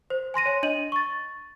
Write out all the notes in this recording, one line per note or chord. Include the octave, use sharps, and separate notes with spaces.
C5
G#5 C6 A#6 D#7
C#5 G#5
D4 D#5 D#7 F#7
C#6 A6